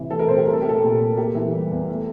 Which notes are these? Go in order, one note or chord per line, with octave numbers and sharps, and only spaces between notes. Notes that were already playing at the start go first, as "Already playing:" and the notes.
Already playing: A2 C3 E3
A3 A4
A#4
C3 C5
G4
A3 A#4
A4
A3 G4
A4
A#2
A#2
A#3 G4
E3
G3
E2
A3